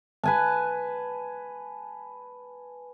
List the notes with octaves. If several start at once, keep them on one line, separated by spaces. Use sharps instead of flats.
B4 G#5 A5